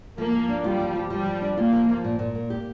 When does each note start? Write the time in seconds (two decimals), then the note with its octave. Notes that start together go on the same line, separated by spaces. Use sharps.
0.18 F3 A#3
0.33 F3
0.49 D4
0.64 G3 F4
0.80 F3
0.95 F3
1.10 F3 G3
1.26 F3
1.42 D4
1.57 A#3 F4
1.72 F3
1.89 F3
2.04 A#2
2.19 A#2
2.35 A#3
2.50 G4